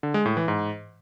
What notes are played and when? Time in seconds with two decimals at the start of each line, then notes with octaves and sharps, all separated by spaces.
0.03 D3
0.14 G#3
0.26 A2
0.37 E3
0.48 G#2